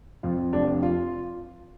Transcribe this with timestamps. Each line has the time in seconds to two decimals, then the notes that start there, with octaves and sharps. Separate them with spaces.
0.23 F2 F4
0.53 F1 D4
0.83 F4